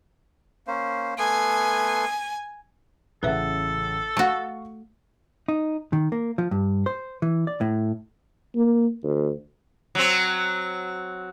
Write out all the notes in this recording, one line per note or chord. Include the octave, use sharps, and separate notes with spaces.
A#3 C#4 C5
A3 B3 G#5 C6
A1 C#3 A4 B4 E5 F#5
A3 F#4 F5 C#6
D#4
D#3
A#3
F3
G2
C5
E3
D5
A2
A#3
D2
F#3 C4